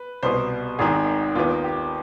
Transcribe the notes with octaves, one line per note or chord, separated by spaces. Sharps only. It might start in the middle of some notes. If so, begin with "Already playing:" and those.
Already playing: B4
C2 B2 B3 C5
G#1 G#2 D#3 G#4
D#2 D#3 B3 F4
G4